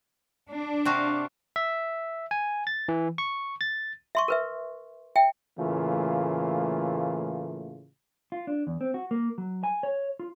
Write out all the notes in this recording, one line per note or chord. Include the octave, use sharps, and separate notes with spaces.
D4
C3 F#4 F5
E5
G#5
A6
E3
C#6
A6
E5 C6 C#6
A#4 B4 E5
E5 G5
A2 C#3 E3 A3 A#3 F4
F4
D4
E2
C4
F#4
A#3
F#3
G#5
C#5
F4